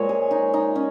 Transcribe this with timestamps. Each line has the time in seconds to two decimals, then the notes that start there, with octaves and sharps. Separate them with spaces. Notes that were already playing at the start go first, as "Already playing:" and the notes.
Already playing: A#2 F3 G#3 C#5
0.09 G#4
0.31 D#4
0.54 D#4
0.75 C#4